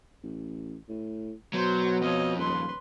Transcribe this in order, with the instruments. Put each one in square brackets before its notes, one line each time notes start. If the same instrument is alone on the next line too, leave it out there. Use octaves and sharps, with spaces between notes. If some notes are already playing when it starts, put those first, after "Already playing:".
[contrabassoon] A1
A2
[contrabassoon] B2 [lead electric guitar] F#3 [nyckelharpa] C5
[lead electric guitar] F2 [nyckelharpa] C#5 D#5
[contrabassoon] D#1 [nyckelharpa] B4 C6